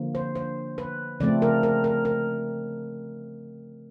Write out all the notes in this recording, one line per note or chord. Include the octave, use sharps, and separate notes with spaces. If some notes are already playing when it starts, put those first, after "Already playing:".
Already playing: D3 F3 A#3
C5
C5
B4
C#3 F3 A3 C4 D5
A#4
A#4
A#4
A#4